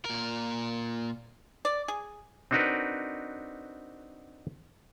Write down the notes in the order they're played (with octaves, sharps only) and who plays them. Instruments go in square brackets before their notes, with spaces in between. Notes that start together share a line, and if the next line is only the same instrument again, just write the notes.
[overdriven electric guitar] A#2 A#4
[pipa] D5
G#4
[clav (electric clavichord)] C4 D4 D#4 F#4 A#4 B4